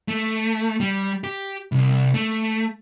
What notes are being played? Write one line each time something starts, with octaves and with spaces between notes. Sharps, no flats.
A3
G3
G4
C2
A3